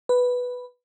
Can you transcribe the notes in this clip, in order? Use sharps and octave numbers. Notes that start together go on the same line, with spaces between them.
B4